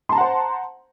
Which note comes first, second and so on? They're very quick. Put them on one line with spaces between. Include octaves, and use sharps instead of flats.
C6 A5 A#5 F#5 C5